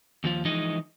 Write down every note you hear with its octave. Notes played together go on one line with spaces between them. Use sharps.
D#2 F3 F4
E3 F3 G#3 D#4 D#5